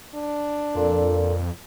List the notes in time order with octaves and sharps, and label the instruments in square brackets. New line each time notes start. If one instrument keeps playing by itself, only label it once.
[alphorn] D4
[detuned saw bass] F2 [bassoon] A#2 [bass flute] A4